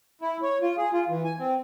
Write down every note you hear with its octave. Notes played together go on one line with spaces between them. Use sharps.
E4
C#5
F4
G#4
F4
E3
G#5
C4